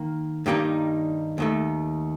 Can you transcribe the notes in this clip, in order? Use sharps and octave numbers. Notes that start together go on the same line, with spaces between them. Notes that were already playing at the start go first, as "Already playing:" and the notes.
Already playing: D#3 A#3
G2 D#3 G3 A#3 D#4
D#2 D#3 A3